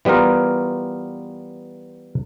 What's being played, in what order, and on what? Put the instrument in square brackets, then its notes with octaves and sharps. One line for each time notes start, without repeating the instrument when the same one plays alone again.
[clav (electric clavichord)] E3 G3 B3 F4 A#4